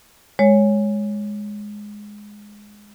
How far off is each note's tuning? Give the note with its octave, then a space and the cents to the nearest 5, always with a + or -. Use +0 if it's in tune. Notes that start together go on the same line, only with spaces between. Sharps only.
G#3 +0 C#5 +0